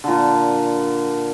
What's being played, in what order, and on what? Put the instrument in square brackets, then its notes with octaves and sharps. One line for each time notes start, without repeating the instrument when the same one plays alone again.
[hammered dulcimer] A#2 D3